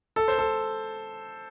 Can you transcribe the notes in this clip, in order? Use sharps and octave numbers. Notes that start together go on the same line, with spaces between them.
A4
C5
A4